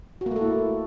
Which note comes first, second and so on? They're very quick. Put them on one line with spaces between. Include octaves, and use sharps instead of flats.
F#4 A#3 A3 A4 E4